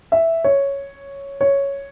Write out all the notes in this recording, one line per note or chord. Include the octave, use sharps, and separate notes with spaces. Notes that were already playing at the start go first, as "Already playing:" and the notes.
E5
C#5
C#5